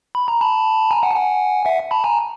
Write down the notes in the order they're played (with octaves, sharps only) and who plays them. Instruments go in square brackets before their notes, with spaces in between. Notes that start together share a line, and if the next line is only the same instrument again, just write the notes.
[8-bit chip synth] B5
A#5
A5 B5
G#5 A#5
F#5 G#5
A5
F#5 G#5
E5 F#5
A5 B5
G#5 A#5